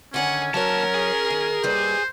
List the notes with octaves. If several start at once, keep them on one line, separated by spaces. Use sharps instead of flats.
D3 D#3 C#4 C#5 F#5 G#5
D#2 F#3 F#4 A#4 C#5 A5
G#4
D#3
D#2 G3 B4 C5